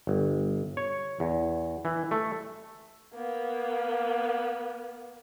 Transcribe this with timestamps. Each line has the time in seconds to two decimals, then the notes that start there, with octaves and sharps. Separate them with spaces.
0.07 G1
0.77 C#5
1.20 E2
1.85 E3
2.11 A3
3.14 A#3 B3